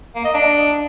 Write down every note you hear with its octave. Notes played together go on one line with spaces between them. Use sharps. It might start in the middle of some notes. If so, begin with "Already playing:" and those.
A#3
D#5
D4